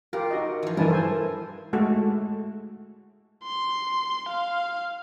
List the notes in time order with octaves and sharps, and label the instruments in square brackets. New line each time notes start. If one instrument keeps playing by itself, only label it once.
[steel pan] F4 G4 [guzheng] A#4
[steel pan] D#4 F#4 D#5
[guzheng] E3 F3
[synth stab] G2 E3 [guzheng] A#4 [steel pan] B4 G#5 A5
[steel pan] A4 C5 G#5
G#3 A3 F#4 A4
[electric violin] C6
F5